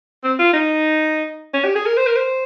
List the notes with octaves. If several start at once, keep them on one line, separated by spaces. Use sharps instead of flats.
C4
F4
D#4
C#4
G4
G#4
A#4
C5
A#4
C5